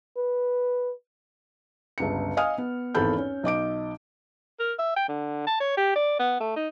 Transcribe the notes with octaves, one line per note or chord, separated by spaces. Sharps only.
B4
G1 C#2 C#7
D#5 F5 G#5 D#6 F6
B3
G#1 E2 A4 B5 G6
C#4
B1 D#5 D6 D7
A#4
E5
G5
D3
A5
C#5
G4
D5
B3
A3
D#4